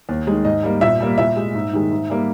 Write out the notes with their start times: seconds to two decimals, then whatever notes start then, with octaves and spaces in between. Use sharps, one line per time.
0.09 D#2
0.27 D#3 G#3
0.45 G#2 D#5
0.63 G3 A#3
0.81 A#2 E5
1.00 G3 A#3
1.18 A#2 E5
1.37 G#3
1.54 G#2
1.73 D#3 G#3
1.91 G#2
2.10 G3 A#3